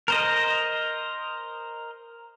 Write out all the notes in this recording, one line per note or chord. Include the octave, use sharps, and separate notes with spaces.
A#4 C5 D#5